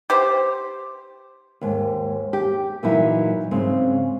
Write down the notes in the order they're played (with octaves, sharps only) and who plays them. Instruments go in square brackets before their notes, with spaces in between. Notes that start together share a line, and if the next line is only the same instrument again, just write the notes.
[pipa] G4 C5
[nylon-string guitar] D#2 G#2
G4
A#2 E3 F#3 D#4 E4
G#2 C#3 C4